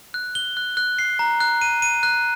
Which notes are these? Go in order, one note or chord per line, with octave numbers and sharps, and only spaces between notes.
F#6
G7
F#6
F#6
C7
A#5
F#6
D#7
D#7
F#6